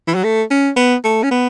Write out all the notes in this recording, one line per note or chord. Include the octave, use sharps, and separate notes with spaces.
E3
F#3
A3
C#4
B3
A3
C#4
B3